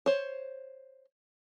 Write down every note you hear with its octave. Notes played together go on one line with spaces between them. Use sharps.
C5 C#5